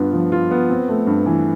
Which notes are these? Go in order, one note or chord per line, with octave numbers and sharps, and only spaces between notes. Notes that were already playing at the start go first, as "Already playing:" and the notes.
Already playing: G2 B3 F4
F3
F4
B3
C4
A3
G2
E3